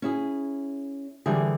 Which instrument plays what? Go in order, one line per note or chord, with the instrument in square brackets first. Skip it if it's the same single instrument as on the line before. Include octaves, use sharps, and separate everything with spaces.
[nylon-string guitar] C#4 E4 G#4
[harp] D3 E3 G3 [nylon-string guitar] G#4